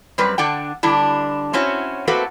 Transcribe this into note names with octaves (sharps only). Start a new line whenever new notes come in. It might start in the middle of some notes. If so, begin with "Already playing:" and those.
F#2 G3 C4 B4
D3 D4 F#5 G5
D3 G3 D4 E4
C4 C#4 E4 F#4 C#5
A3 A#3 C4 F#4 A4 B4